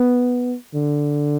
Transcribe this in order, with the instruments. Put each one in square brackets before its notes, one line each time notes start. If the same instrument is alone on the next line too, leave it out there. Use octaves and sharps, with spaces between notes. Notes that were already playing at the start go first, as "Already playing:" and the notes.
Already playing: [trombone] B3
D3